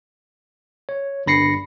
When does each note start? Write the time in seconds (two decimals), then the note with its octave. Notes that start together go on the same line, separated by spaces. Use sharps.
0.89 C#5
1.26 G1 G2 B5 A#6 C7 C#7